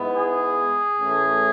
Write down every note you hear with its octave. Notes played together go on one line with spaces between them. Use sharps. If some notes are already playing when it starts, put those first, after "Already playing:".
Already playing: G#2 G#3 B3 E4
G#4
A2 E3 A3 C#4 E4